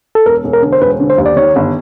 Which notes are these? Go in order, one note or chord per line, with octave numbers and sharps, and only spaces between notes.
A4
E1 A#4
E1
A#4
D3
C5
E1 B4
D3
C5
D#2
D5
D#3 C#5
G1